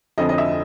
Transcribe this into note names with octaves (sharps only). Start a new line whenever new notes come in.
F1 F2 D3 F3 D#5
D#5
E5